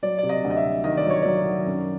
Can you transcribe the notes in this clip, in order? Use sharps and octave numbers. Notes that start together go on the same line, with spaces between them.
F#3 D5
C3 D5
D#5
D2
D#5
E5
C3
D#3 D#5
D5
F#3 C#5
F#3 D5
D#3
F#2